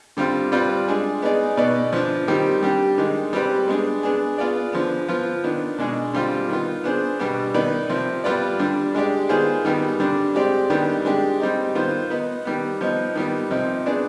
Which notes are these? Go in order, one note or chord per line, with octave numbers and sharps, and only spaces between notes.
D3 G3 C4 F4
G3 C4 F4 B4 D5
G#3 D4 G#4
B3 D#4 G#4 D5
B2 B3 D#4 B4 D5
F3 B3 D4
D#3 G3 C4 G4
G3 D4 G4
D#3 G#3 D4
G3 C4 G4 B4 D5
G#3 B3 D4 G#4
B3 D4 G#4
B3 F4 G#4 D5
D3 F3 B3
F3 B3 F4
D#3 B3 D4
B2 G#3 D4 G#4
D3 G3 C4 F4
D#3 B3 F4
B3 D4 G#4 C5
B2 G3 B3 D4
D#3 B3 D#4 B4 D5
C3 F3 C4
G3 B3 F4 B4 D5
D3 G3 D4
G#3 D4 G4 D5
D#3 B3 F4 G#4 C5
D#3 G3 B3
D3 G3 D4
G#3 C4 G4 D5
D#3 G3 B3 D4 G4
G#3 D4 G4
G3 C4 D#4
D#3 B3 F4 C5
B3 D#4 B4
D#3 G3 B3
F3 B3 D#4
D#3 G3 B3
C3 F3 C4 D#4
B3 D4 G#4 D5